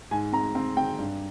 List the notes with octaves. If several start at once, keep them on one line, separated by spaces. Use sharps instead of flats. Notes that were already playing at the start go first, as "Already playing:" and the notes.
G#2 G#5
C4 A#5
C4
C4 G5
G2